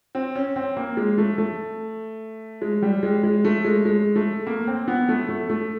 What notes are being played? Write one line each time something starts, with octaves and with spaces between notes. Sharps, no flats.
C4
C#4
C4
A#3
G#3
A3
A3
G#3
G3
G#3
G#3
A3
G#3
G#3
A3
A#3
C4
B3
A3
A3
A3